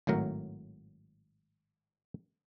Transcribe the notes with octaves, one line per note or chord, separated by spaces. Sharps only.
G#1 A2 F#3 A#4